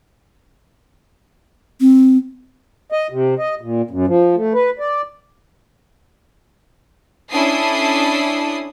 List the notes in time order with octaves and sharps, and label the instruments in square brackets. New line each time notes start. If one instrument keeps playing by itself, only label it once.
[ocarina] C4
[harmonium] D#5
C3
D#5
A#2
F#2
F3
A3
B4
D5
[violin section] C#4 D4 E4 A4 D#6 C7